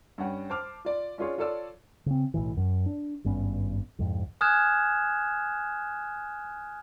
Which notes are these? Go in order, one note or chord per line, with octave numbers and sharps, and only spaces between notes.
G2 C#4 F#5 G5
C5 A5 D6 F6
F4 D5
C#4 D4 F4 G#4 C#5
F4 A4 C#5 D5 E6
C#3 C4
B1 A2 E3
F#2
D4
G#1 G2 B3 C#4
C2 F2 G#2
G#5 D#6 F6 F#6 G#6 E7